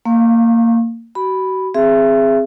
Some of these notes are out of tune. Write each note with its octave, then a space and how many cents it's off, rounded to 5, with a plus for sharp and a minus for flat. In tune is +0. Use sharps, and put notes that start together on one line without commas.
A#3 -20 F5 +10 C#6 -35
F#4 +30 B5 +0
C4 +0 G#4 +0 E5 +25